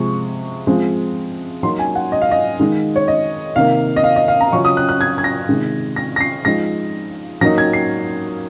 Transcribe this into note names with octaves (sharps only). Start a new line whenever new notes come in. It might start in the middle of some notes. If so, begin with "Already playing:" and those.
Already playing: C3 F3 G#3 C#6
F3 G#3 C4
F#3 A#3 D#4 C6
G#5
F#5
D#5
F5
D#5
D#3 G#3 D#4
C#5
D#5
C3 D#3 A#3 F5
D#5
F5
D#5
F5
A#5
C#3 F#3 C#4 F4 C#6
D#6
F#6
F#6
G#6
G#6
A#6
C3 D#3 G#3
A#6
A#6
C7
F3 G#3 D#4 A#6
F#3 A#3 D#4 A#6
G#6
C7